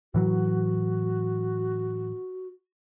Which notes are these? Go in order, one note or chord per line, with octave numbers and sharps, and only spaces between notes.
A2 E3 F#3 F#4